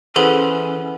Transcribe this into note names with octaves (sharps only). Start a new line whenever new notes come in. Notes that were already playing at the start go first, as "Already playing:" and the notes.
E3 B3 C#4 G#4 A4 C5 F#7